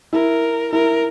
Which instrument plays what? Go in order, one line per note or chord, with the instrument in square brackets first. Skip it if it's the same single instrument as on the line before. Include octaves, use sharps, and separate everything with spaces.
[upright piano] E4 [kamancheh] A#4
[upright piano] E4 [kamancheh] A#4